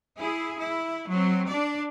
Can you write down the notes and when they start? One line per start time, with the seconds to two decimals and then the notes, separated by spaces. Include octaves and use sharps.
0.18 E4 G#4
0.59 E4
1.10 F#3 C4
1.51 D4 D5